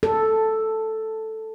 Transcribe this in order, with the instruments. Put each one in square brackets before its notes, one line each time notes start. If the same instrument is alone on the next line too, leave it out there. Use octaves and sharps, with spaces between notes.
[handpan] A4